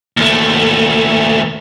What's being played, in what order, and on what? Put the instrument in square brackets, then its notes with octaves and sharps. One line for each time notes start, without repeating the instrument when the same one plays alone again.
[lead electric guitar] D#2 A3